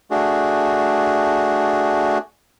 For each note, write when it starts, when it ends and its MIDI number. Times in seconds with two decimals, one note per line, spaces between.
0.11 2.18 57
0.11 2.18 62
0.11 2.18 66
0.11 2.18 68